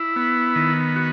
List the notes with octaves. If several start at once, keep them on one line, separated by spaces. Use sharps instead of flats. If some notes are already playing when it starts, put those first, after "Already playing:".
Already playing: E4
B3
D#3
F#4